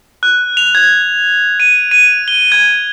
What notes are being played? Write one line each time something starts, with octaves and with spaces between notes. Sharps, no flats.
F#6
F7
G#6
D#7
D#7
G7
G#6